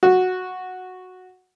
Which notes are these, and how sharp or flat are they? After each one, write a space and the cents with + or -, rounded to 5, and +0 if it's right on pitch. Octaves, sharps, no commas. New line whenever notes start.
F#4 -5